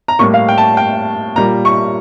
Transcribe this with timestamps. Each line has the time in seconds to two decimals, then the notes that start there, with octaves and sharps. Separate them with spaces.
0.08 A#5
0.19 A2 G3 A#3 C#6
0.34 F5
0.48 G5
0.58 A5
0.77 G5
1.36 A#2 G3 A#3 A#5
1.65 C#6